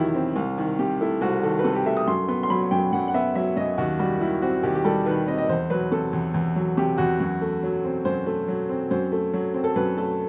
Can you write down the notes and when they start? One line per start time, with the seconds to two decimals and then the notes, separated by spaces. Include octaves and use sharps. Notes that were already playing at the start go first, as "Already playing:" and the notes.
Already playing: E2 D#3 F#3 E4 G4
0.14 C4
0.36 C2
0.58 D#3
0.79 C3 G4
1.01 A3 E4
1.21 C2 F#4
1.43 D#3 A4
1.59 B4
1.64 C3 A4
1.75 G4
1.85 A3 E5
1.97 D#6
2.07 F#2 C6
2.28 B3 C6
2.43 C6
2.50 F#3 B5
2.71 F#2 G5
2.92 F#2 F#5
3.08 F#5
3.14 B3 E5
3.35 F#3 E5
3.56 F#2 D#5
3.78 D#2 F#4
3.99 G3 F#4
4.20 D#3 E4
4.42 C4 F#4
4.63 D#2 G4
4.75 G4
4.84 G3 A4
5.06 D#3 B4
5.28 C4 D#5
5.38 D#5
5.49 E2 C5
5.70 F#3 B4
5.92 C3 A4
6.13 E2
6.34 E2
6.56 F#3
6.77 C3 G4
6.98 E2 F#4
7.20 F#2
7.41 A3
7.63 F#3
7.84 C4
8.05 F#2 C5
8.26 A3
8.48 F#3
8.69 C4
8.91 F#2 C5
9.12 A3
9.34 F#3
9.54 C4
9.64 A4
9.76 F#2 B4
9.97 A3 A4